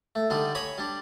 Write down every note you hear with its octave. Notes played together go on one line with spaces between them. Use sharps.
A3
D3 G3 D4 D#4
C#5 G#5 A#5 B5 D#6
G3 D4